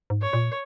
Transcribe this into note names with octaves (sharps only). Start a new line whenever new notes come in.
G#2
C#5
A#2